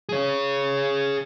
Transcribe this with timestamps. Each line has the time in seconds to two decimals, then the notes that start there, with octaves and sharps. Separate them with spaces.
0.09 G#4 C#5